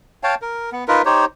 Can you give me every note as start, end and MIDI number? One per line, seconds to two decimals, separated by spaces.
0.23 0.35 73
0.23 0.35 77
0.23 0.35 79
0.23 0.35 81
0.42 0.70 70
0.72 0.84 59
0.88 1.02 63
0.88 1.02 65
0.88 1.02 70
0.88 1.02 71
1.05 1.25 63
1.05 1.25 67
1.05 1.25 72
1.05 1.25 73